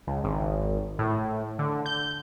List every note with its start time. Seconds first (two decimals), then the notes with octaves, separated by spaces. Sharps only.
0.07 C#2
0.24 G#1
0.99 A2
1.59 D3
1.86 G6